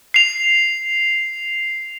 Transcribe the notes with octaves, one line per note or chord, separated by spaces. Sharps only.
C7 F7